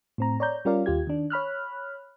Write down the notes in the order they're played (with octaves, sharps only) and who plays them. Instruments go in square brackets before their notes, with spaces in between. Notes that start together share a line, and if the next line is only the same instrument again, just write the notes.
[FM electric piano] A2 C4 A#5
C#5 D5 A#5 G6
G3 C#4 F4 A#4 D5 F5
D#2 F4 G4 G#6
D#3 D4
C#5 B5 F6 F#6